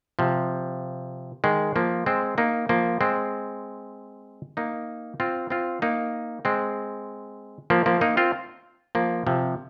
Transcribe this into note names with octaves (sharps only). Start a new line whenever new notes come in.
C3 F3
D#3 G#3
F3 A#3
G#3 C4
A#3 D#4
F3 A#3
G#3 C4
A#3 D#4
C4 F4
C4 F4
A#3 D#4
G#3 C4
F3 A#3
F3 A#3
A#3 D#4
C4 F4
F3 A#3
C3 F3